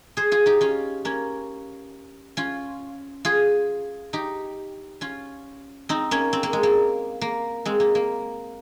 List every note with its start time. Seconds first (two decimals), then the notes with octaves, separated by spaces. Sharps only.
0.17 G#4 C5
0.31 F4 G#4
0.46 D#4 G4
0.61 C#4 F4
1.05 A#3 C#4
2.37 C#4 F4
3.25 F4 G#4
4.13 D#4 G4
5.01 C#4 F4
5.89 C4 D#4
6.11 A#3 C#4
6.33 C4
6.43 A#3
6.53 G#3
6.63 A#3
7.21 A#3
7.65 G#3 C4
7.80 A#3
7.95 A#3